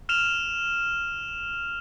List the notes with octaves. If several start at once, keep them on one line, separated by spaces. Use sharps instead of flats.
F6 E7 F7